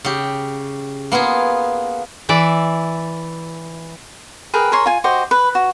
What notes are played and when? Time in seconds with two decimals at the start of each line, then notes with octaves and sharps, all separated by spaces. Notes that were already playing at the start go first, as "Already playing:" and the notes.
0.05 C#3 G4
1.12 A#3 B3 F4 G#4
2.29 E3 D5 E5
4.54 G#4 A#4 B4 G5
4.72 G#4 A#4 C#5 C6
4.86 F4 G#5
5.04 F#4 G4 C5 D#5
5.31 B4
5.55 F#4